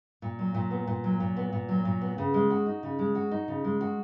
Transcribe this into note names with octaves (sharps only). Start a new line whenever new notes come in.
A#2
F#3
A#2
B3
A#2
F#3
A#2
B3
A#2
F#3
A#2
B3
C#3
G#3
F#4
D#4
C#3
G#3
F#4
D#4
C#3
G#3
F#4